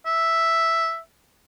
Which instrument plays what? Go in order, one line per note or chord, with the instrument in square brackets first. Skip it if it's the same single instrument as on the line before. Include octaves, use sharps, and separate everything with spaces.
[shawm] E5